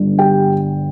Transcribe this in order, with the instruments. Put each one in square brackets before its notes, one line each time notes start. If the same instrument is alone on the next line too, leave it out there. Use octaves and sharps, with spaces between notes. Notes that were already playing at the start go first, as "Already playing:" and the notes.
Already playing: [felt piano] G1 G2 D3
G4 G5